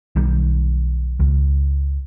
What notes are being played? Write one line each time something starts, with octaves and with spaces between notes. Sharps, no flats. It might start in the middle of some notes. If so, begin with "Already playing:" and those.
B1 D#3 G3
C#2